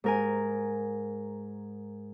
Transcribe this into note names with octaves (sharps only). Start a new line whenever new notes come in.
G#2 A#4 G#5